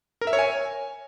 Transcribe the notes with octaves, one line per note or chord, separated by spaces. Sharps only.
A#4
E5
C#5
G#5